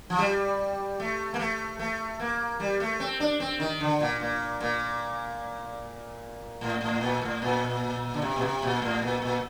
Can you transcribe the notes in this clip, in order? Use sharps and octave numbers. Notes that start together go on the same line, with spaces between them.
F3
G3
A3
A#3
A3
A3
A#3
G3
A3
C4
D4
C4
D#3
D3
A#2
A#2
A#2
A2
A2
A#2
A2
A#2
D3
C3
A#2
C3
A#2
A2
A#2
A#2